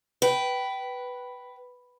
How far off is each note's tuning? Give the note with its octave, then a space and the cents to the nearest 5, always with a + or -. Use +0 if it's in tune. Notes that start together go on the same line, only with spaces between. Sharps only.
B4 +0 G5 -20